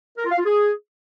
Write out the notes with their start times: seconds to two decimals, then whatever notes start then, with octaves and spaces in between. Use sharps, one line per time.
0.18 A#4
0.25 F4
0.31 F5
0.38 F4
0.45 G#4